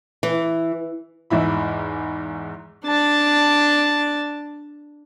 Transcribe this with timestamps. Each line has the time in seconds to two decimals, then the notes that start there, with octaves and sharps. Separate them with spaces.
0.23 E3
1.30 E2 G#2 E4 B5
2.85 D4 A5